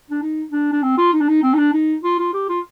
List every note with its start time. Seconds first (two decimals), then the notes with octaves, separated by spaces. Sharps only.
0.11 D4
0.22 D#4
0.52 D4
0.73 D4
0.83 C4
0.98 F4
1.13 D#4
1.21 D4
1.29 D#4
1.43 C4
1.54 D#4
1.59 D4
1.74 D#4
2.04 F4
2.19 F4
2.34 G4
2.49 F4